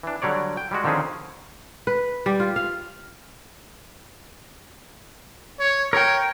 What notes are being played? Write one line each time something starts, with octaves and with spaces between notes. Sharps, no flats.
E3 D4
D3 F#3 G3 C#5 D5
G5
G3 G#3 F#4
D3 D#3 F3 C4 C#4 G#4
B4
G3
F4
F5
C#5
A#4 C#5 G5